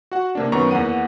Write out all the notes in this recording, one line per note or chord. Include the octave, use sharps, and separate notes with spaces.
F#4 F#5
C3 A#3 D4
F#2 D#3 B3 A#5 C#6
E2 A#3 F#5 D#7